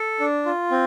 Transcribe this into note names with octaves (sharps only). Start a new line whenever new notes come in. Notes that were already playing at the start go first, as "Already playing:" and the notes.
Already playing: A4
D4
F4
C4